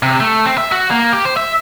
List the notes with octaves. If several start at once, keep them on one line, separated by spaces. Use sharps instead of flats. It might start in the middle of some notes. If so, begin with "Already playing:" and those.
C3
A3
C4
E5
F#4
A#3
G4
C5
E5